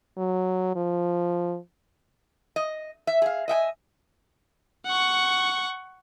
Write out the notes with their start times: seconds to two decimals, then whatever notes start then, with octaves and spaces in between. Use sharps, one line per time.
0.17 F#3
0.75 F3
2.56 D#5
3.07 E5
3.22 G#4 F5
3.48 D#5 E5 G5 G#5
4.87 F#5 C#6